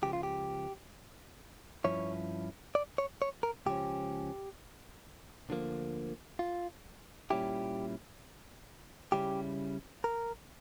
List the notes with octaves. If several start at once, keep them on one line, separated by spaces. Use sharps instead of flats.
C#2 C#3 F3 G4
F4
G4
G2 F3 C#4 E4 C#5
D5
C#5
C#5
A#4
C#2 C#3 F3 C#4 G4
D2 D3 F3 A#3
F4
A#2 G3 C#4 E4 G4
C#3 G3 C#4 E4 G4
A#4